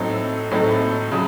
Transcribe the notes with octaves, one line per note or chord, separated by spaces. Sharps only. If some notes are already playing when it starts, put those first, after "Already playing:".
Already playing: A2 F#3 C4 D#4 A4
A2 F#3 C4 D#4 A4
C#3 F#3